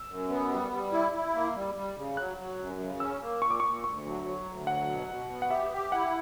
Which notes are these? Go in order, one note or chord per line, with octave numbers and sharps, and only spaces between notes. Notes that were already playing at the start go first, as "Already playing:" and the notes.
Already playing: E6
F#2
B3
G3
G3
E4
E4
A#3
G3
G3
C#3
F#3 F#6
F#3
F#2
C#3
C#4 E6
A#3
A#2 C#6
D6
A#2 C#6
D2 C#6
F#3
F#3
D2
F#3 F#5
B2
B2
B3
F#5
G4 E5
G4
E4 F#5